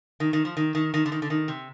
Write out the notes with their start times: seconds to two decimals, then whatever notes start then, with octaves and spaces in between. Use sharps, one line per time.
0.20 D#3
0.33 D#3
0.45 F3
0.57 D#3
0.75 D#3
0.94 D#3
1.06 D3
1.12 D#3
1.22 D3
1.30 D#3
1.48 C3